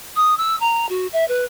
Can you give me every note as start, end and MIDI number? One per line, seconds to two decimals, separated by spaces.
0.16 0.36 87
0.37 0.56 88
0.60 0.88 82
0.89 1.07 66
1.13 1.26 76
1.28 1.45 71